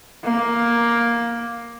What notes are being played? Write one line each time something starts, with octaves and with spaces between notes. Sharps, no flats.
A#3